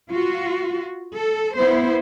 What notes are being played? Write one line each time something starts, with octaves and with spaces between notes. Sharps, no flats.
F4 F#4
A4
B3 E4 C5